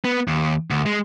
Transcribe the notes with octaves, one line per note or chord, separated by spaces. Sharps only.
B3
D#2
D2
G#3